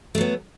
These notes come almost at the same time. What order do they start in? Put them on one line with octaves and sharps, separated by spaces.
A3 F#3 B3